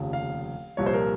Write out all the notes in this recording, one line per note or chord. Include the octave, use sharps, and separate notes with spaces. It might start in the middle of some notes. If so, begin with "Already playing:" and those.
Already playing: F1 D#2 C#3 F3
F5
C2 A#2 F3 C#5
C5
A#4